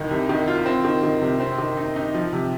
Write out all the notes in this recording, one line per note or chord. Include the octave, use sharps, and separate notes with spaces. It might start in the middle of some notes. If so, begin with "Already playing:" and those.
Already playing: C2 D#3
C3
D#3
F4
C4
D#3
D#3
C3
C4
D#3
D#4
D#4
F3
C3